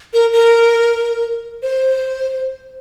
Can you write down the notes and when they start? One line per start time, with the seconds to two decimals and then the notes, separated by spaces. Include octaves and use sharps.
0.13 A#4
0.33 A#4
1.63 C5